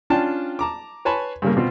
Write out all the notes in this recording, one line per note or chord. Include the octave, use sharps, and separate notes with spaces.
C#4 D4 F4 G5 A5
A5 A#5 D6
B4 C#5 G#5 A5 B5 C6
G2 C#3 A#3
B2 C4 F4